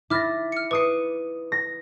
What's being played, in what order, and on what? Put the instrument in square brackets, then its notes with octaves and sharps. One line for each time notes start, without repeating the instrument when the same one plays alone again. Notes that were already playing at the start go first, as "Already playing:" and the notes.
[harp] E4 A6 A#6 [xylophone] D6 F6
[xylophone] F6 C#7
[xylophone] B4 C7 [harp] D6 D#6 C#7
[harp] A#6